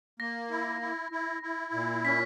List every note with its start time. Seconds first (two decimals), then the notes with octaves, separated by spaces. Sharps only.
0.20 A#3 A#6
0.51 E4
0.81 E4
1.12 E4
1.43 E4
1.73 A#2
2.04 C#4 B6